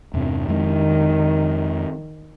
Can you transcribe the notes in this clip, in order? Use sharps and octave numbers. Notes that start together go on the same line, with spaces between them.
E2 G2 C3
F2 D#3 G#3